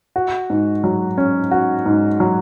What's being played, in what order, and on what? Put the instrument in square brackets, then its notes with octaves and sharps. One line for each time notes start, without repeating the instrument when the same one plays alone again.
[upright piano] F#4
G#2
F#3
C#4
F#4
G#2
F#3